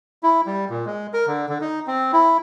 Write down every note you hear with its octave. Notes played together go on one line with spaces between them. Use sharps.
E4
G3
A#2
G#3
A#4
D3
D3
D#4
C4
E4